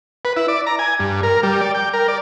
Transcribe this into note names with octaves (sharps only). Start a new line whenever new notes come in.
B4
E4
D5
A#5
G#5
G2
A#4
G3
D5
G5
A#4
D5